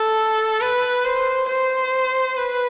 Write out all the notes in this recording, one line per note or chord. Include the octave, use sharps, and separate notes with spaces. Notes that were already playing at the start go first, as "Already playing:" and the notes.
Already playing: A4
B4
C5
C5
B4